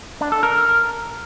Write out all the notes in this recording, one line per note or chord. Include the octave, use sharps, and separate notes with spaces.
D4
A4
A#4